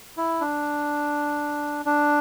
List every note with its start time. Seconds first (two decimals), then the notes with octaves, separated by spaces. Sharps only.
0.17 E4
0.41 D4
1.85 D4